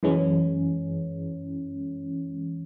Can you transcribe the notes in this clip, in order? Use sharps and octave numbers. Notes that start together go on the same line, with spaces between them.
F#2 E3 G#3 C#4